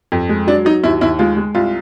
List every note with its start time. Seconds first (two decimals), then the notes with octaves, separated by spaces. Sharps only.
0.12 F2
0.29 G#3
0.47 F#3 D4
0.65 F#3 D#4
0.84 D#2 E4
1.01 D#2 E4
1.19 G#3 F4
1.37 G#3
1.55 C2 F4